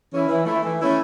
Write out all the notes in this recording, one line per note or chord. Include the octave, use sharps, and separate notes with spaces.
E3 C#4 E4
E3
A3 E4
E3
A3 C#4 E4